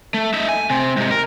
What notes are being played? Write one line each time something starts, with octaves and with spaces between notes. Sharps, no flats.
A3
D#4 E5
G#5
C3 C4
G#2 C3
A#4